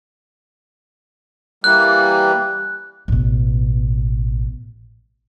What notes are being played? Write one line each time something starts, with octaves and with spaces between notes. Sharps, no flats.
E3 G3 A#3 F#6
A1 B2